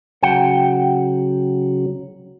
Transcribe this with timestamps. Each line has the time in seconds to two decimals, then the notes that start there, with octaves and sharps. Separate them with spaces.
0.23 C#3 F#3 F#5 G5